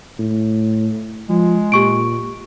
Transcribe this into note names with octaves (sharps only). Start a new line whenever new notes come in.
A2
F3 G#3
A#2 G4 C#6 D7